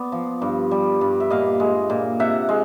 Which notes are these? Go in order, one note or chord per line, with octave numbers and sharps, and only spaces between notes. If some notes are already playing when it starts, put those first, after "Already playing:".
Already playing: B3 D5
F3
G2
G3
G2
E5
A#2 D#5 F5
G#3
A#2
C3 E5 F#5
G#3